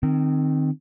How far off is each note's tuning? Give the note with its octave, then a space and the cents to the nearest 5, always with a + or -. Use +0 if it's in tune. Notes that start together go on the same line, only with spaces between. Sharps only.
D#3 -25 C4 +0